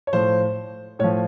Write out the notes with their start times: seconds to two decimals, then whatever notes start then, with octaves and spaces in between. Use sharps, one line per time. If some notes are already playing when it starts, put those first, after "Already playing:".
0.07 C#5
0.13 A2 F3 C5
0.99 A2 C#5
1.04 F3